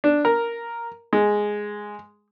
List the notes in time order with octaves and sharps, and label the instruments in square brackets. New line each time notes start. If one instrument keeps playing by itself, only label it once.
[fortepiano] D4
A#4
G#3